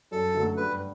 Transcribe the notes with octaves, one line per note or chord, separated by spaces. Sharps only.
F#2 A4
D3 F#3 A3
G2 B4